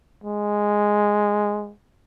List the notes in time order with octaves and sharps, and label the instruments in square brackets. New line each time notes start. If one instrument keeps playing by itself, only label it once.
[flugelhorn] G#3